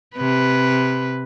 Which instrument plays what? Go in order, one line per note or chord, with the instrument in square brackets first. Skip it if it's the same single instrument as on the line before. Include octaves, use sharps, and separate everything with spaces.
[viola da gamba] C3 B4